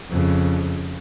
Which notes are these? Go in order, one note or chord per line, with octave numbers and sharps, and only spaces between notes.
F2 C#3